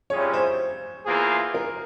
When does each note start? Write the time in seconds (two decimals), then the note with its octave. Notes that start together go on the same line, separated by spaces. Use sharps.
0.10 C3 G3 C#4 F4 G#4 C#5
0.34 C5
1.05 E2 E3 A#3 F4 G#4
1.54 A#4